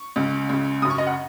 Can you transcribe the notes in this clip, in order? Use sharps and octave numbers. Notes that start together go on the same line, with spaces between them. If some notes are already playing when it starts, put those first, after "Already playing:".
Already playing: C#6
C#2 C#3
C#2 C#3
F#2 C#3 D#6
C#6
D#5
F#5